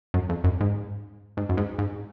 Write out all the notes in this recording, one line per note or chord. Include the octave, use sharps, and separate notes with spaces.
F#2
F2
F#2
G#2
G#2
F#2
G#2
G#2